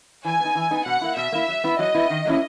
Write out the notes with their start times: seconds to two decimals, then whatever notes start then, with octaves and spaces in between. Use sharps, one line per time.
0.25 E3 G#5
0.40 B3 D#4
0.55 E3
0.71 B3 D#4
0.86 B2 F#5
1.01 A#3 E4
1.17 B2 E5
1.32 A#3 E4
1.48 F#3
1.64 B3 E4
1.79 F#3 D#5
1.95 B3 E4
2.10 D#3
2.25 F#3 A#3 C#4 E4